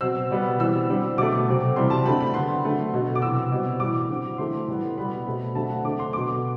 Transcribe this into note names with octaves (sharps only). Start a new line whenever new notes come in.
B2 F#3 C4 E6
B2 G3 B3
E3 G3 C4 E6
D3 G3 C4
B2 F#3 A3 D6
C3 F#3 C4
C3 E3 G3 C4 C6
A5
D3 A3 C4 B5
B5
D3 F#3 B3 C6
D3 F#3 A3 C4
B2 F#3 B3
D6
C3 E3 B3 E6
B2 G3 C4
A2 E3 G3 D6
D3 F#3 C4
E3 A3 C4 C6
A2 E3 G3 B3
B2 G3 B3 B5
B2 A3 C4
D3 F#3 A3 C4 A5
F#5
D3 A3 C4 D6
C6
B2 F#3 B3 D6